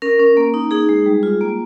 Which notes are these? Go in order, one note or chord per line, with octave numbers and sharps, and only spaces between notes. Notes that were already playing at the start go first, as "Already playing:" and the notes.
C#4 A#4
C#4
A#3
D#4
D#4 G#4
G#3 G#4
G3
F4
A#3